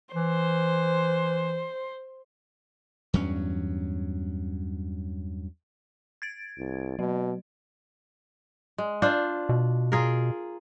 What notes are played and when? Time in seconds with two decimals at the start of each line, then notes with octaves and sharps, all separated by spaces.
0.14 E3 C5
3.14 E2 G2 F#3 C#4
6.22 G#6 A6 D7
6.58 C2
6.99 B2 F#3
8.78 G#3
9.02 D4 F4 C5
9.49 B2
9.92 F4 G#4 A#4